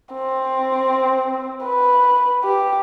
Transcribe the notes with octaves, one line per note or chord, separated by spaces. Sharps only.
C4
B4
G4